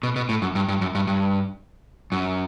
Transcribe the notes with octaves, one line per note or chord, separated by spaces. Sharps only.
B2
B2
A2
F#2
G2
G2
F#2
G2
G2
F#2